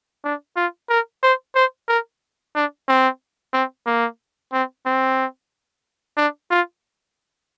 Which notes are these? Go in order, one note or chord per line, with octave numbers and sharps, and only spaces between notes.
D4
F4
A#4
C5
C5
A#4
D4
C4
C4
A#3
C4
C4
D4
F4